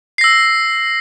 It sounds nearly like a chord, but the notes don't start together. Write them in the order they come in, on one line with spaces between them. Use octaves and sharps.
C7 A#6 E6